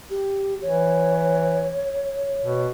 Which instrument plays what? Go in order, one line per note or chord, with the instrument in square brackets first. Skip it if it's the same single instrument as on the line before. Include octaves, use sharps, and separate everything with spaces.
[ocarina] G4
[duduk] E3 [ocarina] C#5
[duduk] B2